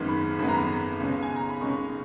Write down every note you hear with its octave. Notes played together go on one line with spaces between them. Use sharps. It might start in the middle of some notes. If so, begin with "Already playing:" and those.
Already playing: G#1 F#2 D#3 G#3 B3
B5
G#1 F#2 D#3 G#3 B3 B5
A#5
B5
C#2 B2 G#3 C#4
G#5
A#5
B5
C#2 B2 G#3 C#4 C#6